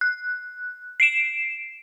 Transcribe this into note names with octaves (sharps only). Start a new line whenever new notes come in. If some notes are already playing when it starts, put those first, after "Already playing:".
F#6
C7 D7 E7